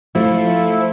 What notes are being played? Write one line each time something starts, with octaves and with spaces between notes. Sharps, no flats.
F3 A3 E4 F4 C5 C#7